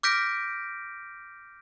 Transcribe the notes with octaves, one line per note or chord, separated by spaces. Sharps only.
D6 F6 G6 A#6 B6 D7